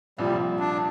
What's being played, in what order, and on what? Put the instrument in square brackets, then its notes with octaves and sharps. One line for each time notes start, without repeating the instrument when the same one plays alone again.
[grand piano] C2 A#2 F3 [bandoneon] G3
[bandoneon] D4